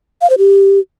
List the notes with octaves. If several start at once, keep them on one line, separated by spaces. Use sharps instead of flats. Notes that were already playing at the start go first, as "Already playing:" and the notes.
F5
C5
G4